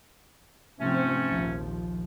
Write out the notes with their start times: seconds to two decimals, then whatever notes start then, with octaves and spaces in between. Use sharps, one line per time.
0.80 G#2 C3 F3 A3 C4 C#4
1.29 A#1 D#2 F3